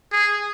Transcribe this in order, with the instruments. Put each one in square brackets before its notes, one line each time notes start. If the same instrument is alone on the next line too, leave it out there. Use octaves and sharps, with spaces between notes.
[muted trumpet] G#4